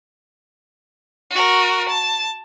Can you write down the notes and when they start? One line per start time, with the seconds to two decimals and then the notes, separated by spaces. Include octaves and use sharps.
1.31 F#4 A#4
1.89 A5